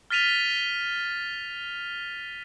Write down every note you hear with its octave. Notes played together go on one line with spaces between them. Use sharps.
F6 A6 B6 D#7 F7 G7